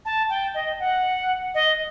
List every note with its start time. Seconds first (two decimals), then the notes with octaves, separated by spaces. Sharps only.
0.05 A5
0.30 G5
0.54 D#5
0.80 F#5
1.55 D#5